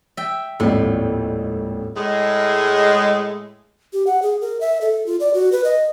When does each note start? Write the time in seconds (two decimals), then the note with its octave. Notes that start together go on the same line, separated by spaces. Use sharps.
0.17 E5 G5
0.60 D#1 G#1 F2 A2
1.96 A2 G#3
3.93 G4
4.07 F#5
4.22 G#4
4.41 A#4
4.60 E5
4.81 A4
5.06 F4
5.20 D5
5.34 F#4
5.52 B4
5.64 D#5